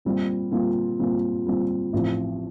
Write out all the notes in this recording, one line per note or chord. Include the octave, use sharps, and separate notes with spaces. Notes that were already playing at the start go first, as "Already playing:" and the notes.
A#2 G3 C4 F4
A#2 G3 C4 F4
A#2 G3 C4 F4
A#2 G3 C4 F4
A1 A2 F3 C4